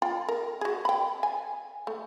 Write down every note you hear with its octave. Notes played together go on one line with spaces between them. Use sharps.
F4 G5
A#4
F#4 G#4
G5 B5
G#5
A3